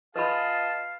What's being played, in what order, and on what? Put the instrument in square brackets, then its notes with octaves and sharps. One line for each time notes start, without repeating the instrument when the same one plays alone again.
[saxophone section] F4 G#4 D#5 [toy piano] B4 B5 [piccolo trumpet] F5 [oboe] A5